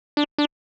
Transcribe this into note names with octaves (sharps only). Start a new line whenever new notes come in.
D4
D4